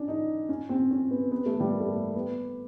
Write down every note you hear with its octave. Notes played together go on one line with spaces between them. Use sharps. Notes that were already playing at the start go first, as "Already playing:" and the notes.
Already playing: C#4 D4
D#4
C#4
C4
C#4
B3
B3
A3
G3
A#3
A3
A#3
B3